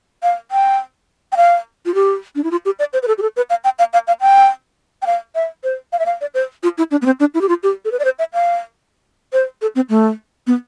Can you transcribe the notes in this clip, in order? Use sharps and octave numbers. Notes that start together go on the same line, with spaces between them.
F5
G5
G5
F5
F4
G4
D4
E4
F4
G4
D5
C5
B4
A4
G4
A4
B4
F5
G5
F5
F5
F5
G5
G5
F5
E5
C5
F5
E5
F5
D5
C5
F4
E4
D4
B3
C4
D4
E4
G4
F4
G4
A4
B4
D5
C5
E5
F5
C5
A4
C4
A3
B3